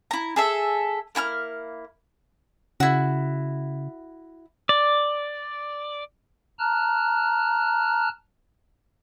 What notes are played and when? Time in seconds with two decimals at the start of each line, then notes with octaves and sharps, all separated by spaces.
0.11 E4 A#5
0.36 G#4 A4 E5
1.15 A#3 E4 G#5 F6
2.80 C#3 E4 F#4
4.69 D5
6.59 A5 A#5 F6 F#6